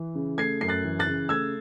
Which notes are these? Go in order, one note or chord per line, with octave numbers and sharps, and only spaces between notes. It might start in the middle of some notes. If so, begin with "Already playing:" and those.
Already playing: E3
C#3
A3 G#6 C7
F#2 C7
F#6 A6
E3
F#6 A6
C#3
A3 E6 G#6